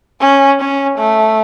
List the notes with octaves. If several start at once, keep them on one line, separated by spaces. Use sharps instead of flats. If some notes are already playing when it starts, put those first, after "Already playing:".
C#4
C#4
A3